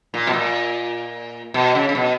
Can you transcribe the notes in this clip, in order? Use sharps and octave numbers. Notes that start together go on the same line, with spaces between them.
A#2
B2
A#2
B2
C#3
C#3
B2